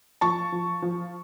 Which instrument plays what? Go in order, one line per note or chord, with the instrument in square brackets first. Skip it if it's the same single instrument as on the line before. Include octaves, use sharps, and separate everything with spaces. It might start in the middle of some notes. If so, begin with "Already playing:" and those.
[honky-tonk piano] F3 [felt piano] A5 C#6
[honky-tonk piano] F3
F3